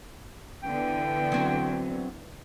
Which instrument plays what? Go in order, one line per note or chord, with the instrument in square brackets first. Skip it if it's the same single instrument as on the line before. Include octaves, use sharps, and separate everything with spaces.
[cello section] D3 E3 B3 [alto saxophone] G5
[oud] F#3 C4